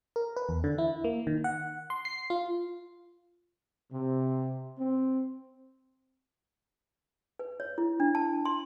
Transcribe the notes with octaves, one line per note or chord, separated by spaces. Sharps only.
A#4
B4
E2
D3
E4
A#3
D#3
F#5
C6
C7
F4
C3
C4
B4
C#5
E4
D4
A5
C6